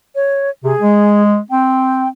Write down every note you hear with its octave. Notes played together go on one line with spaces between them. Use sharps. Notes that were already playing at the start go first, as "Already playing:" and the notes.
C#5
C3 G#4
G#3
C4 G5